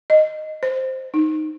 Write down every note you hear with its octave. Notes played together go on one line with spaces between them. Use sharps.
D#5
C5
D#4